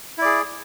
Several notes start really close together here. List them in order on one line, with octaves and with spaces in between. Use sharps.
E4 D5 G#4